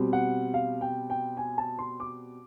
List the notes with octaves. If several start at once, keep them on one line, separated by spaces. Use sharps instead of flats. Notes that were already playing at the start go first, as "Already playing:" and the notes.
Already playing: B2 G3 C4
F#5
F5
G5
G5
G#5
A5
C6
D6